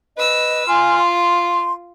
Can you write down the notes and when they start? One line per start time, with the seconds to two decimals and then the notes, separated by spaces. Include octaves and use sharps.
0.17 B4 D#5 E6
0.68 F4 G#5 C6 F6
0.99 C6